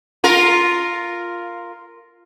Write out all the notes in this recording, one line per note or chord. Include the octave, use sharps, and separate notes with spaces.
F4 A#4